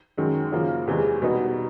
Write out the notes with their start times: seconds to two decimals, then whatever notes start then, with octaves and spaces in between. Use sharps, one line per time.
0.17 F#2 D#3 G#3
0.52 F#2 C#3 F3 A#3
0.87 E2 C3 E3 G#3
1.22 B2 G3 B3 D#4